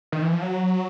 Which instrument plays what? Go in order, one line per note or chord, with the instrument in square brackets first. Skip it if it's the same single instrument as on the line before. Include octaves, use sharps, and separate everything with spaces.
[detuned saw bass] D#3
E3
F3
F#3